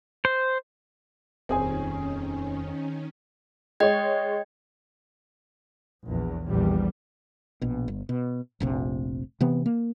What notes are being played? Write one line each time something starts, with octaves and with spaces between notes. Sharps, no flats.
C5
D#1 F2 D#3 C4 C#4 G#4 G#5
G#3 C#5 D#5 G5 G#6
A#1 E2
A#1 E2 G3
A#1 B2
G1
B2
F1 A#1 C3
C3 E3 B3
A#3